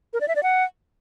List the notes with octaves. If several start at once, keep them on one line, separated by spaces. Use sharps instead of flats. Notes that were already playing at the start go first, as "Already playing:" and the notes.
A#4
D5
E5
D5
F#5